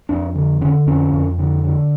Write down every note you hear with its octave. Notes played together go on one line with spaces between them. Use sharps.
F2 D4
D3
D3 C#4
F2 C#4
F2
D3
D3